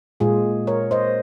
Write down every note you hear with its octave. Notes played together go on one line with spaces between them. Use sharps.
A#2 G#3 F4 G#4
A#4 C#5
C5 D#5